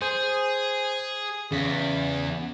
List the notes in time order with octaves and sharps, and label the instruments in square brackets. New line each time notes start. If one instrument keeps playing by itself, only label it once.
[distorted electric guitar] G#4 [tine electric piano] C5
[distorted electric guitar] E2 [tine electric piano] C#3 B6